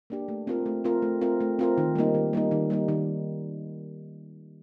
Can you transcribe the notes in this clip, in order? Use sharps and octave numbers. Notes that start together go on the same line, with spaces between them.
A#3 D4 G4
A3
C4 F4 A#4
A3
C4 F4 A#4
A3
C4 F4 A#4
A3
C4 F4 A#4
D#3
G3 A#3 D#4
D#3
G3 A#3 D#4
D#3
G3 A#3 D#4
D#3